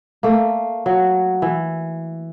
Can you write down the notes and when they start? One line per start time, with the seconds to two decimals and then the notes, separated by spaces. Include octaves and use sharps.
0.23 A3 A#3
0.86 F#3
1.42 E3